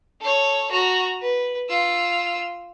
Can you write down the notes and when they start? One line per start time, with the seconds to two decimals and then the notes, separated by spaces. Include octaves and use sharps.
0.21 A4 C#5
0.72 F#4 A#5
1.21 B4
1.69 F4 E6